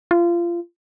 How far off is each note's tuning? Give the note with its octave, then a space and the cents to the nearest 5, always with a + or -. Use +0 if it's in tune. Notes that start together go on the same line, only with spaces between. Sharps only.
F4 -25